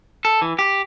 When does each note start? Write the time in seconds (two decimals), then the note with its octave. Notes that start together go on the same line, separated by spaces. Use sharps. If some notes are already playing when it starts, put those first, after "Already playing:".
0.25 A4
0.42 E3
0.59 G4